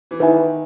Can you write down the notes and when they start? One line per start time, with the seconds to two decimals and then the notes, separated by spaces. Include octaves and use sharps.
0.11 E3
0.19 D#3 B4 E5 G#5